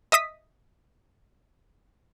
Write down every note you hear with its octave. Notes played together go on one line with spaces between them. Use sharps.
D#5 E5 D#6 B6